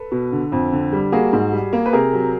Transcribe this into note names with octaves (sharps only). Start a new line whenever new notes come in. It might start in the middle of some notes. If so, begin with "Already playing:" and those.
Already playing: A4 B4
B2
D3
F2
D3
G3
A#3 F#4 G#4
G#2
G3
A#3
B4
C3 G#4 A#4
F#3